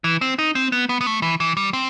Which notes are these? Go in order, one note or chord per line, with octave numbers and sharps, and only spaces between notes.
E3
C4
D#4
C4
B3
B3
B3
A3
E3
E3
G3
C4